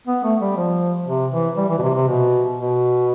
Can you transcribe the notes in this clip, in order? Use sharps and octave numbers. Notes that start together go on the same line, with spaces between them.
B3
A3
G3
F3
C3
E3
G3
E3
B2
C3
C3
B2
B2